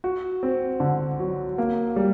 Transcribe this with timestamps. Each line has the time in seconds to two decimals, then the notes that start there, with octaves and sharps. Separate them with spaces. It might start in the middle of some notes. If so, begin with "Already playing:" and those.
0.04 F#4
0.43 C4
0.80 D3
1.20 F#3
1.58 A#3
1.96 G3